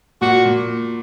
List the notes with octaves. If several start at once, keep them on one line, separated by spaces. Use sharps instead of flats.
A#2 F#4
A#2